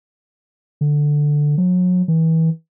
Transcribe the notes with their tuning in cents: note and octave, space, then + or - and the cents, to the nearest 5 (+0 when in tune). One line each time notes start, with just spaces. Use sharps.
D3 +5
F#3 -35
E3 -30